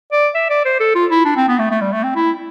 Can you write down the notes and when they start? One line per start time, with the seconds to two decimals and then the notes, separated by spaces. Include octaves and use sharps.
0.13 D5
0.35 E5
0.50 D5
0.65 C5
0.80 A4
0.95 F4
1.11 E4
1.25 D4
1.37 C4
1.48 B3
1.59 A3
1.71 A3
1.81 G3
1.92 A3
2.04 C4
2.16 E4